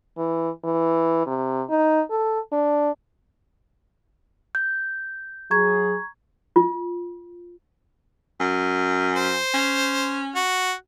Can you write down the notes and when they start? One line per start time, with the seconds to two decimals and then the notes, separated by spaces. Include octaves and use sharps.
0.18 E3
0.64 E3
1.26 C3
1.70 D#4
2.10 A4
2.52 D4
4.55 G6
5.51 F#3 G#4 A#5 C#6 G#6
6.56 F4
8.40 F#2
9.16 C5
9.54 C#4
10.36 F#4